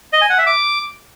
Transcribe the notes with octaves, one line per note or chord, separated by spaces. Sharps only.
D#5
G#5
F#5
E5
D6